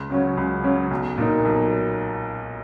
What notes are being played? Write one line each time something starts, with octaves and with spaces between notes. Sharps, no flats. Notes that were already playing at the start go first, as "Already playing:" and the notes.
Already playing: C#2
C#3 F#3 C#4
C#2
C#3 F#3 C#4
B1
A#2 A#3 D#4
B1